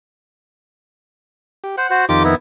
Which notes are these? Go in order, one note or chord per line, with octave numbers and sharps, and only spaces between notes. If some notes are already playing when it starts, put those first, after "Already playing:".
G4
C5 F#5
F#4 C5
F2 D#3 D#4 F4 G4 D6
B3 E4